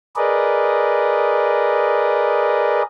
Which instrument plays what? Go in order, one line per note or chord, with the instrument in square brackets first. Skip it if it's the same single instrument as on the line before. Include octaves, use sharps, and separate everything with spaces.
[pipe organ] G#4 A#4 B4 D5 D#5